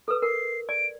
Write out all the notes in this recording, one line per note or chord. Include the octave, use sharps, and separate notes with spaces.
A4 B4 D#6
A#4 C7
D5 D7